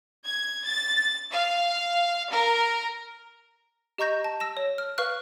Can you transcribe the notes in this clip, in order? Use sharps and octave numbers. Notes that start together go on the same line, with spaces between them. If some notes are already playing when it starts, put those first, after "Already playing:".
G#6
A6
F5
A#4
G4 D#5 A#5 C#6 G6 A#6
A5
E6 A#6 E7
C#5
F6
B4 F5 C#6 F6 F#6